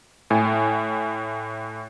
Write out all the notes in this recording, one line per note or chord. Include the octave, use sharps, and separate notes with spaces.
A2 G#5